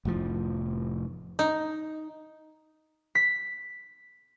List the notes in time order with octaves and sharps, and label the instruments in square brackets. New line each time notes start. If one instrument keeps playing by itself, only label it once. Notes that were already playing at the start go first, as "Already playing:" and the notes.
[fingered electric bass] F1 A2 F3
[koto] D#4
[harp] B6